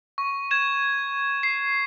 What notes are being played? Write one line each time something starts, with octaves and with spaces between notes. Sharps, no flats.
C#6
G#6 E7
C7